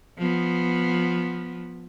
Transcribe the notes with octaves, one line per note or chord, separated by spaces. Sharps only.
F3 B3